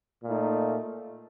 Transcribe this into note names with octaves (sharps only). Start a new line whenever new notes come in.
A#2 A3 D#4